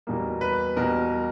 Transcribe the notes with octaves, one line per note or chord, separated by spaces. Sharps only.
E2 B2 G3 A#3
B4
E2 B2 G3 A#3 A#4